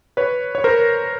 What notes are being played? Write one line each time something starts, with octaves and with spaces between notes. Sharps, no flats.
B4 C#5
C#5
A#4 C5